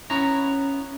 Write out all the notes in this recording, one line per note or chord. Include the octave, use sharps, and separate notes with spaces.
B3 C#4 E4 C#5 A#5